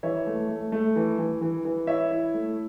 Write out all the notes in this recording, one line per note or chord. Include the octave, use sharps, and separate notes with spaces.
E3 C#5 E5
A3
A3
A3
E3
E3
E3
E3
E4 C#5 E5
E4
A3